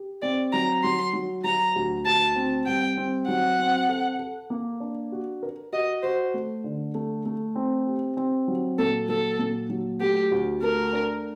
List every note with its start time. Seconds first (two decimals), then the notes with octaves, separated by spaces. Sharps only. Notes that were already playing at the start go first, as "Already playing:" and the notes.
Already playing: G4
0.22 C4 D5
0.52 F#3 A#5
0.84 F#3 C6
1.13 F#3
1.44 F#3 A#5
1.76 D2
2.06 D2 A5
2.36 C4
2.66 C2 G5
2.97 C4
3.28 F#3 F#5
3.59 C4
3.89 A4
4.19 A4
4.50 A#3
4.80 D4
5.12 F#4
5.43 A#4
5.73 F#4 D#5
6.03 F#4 C5
6.34 A3
6.64 D3
6.95 A3
7.26 A3
7.55 C4
7.87 G4
8.17 C4
8.48 F#3
8.78 A#2 A4
9.09 F#3 A4
9.39 A#2
9.70 F#3
10.01 A3 G4
10.31 D2
10.62 A3 A#4
10.93 D4